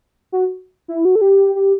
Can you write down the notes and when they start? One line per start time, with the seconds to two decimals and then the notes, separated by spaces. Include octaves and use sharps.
0.32 F#4
0.88 E4
1.05 F#4
1.15 A4
1.21 G4
1.55 G4